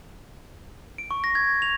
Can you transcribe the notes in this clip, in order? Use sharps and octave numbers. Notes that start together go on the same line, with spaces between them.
D7
C#6
A#6
G#6
F7